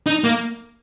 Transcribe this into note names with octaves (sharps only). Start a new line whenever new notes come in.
D#4
A#3